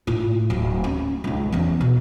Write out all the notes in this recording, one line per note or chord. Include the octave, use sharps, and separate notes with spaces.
A2 F4
D1
C#4
C#2 G#2
E2 C#4
B2